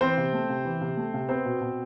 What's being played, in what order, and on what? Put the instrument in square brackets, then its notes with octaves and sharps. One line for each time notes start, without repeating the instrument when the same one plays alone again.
[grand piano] E3 C4 C5
C3
A3
C3
E3
C3
A3
C3
B3 C4 C5
B2
B2